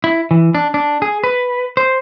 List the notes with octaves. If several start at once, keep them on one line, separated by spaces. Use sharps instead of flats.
E4
E3
D4
D4
G#4
B4
C5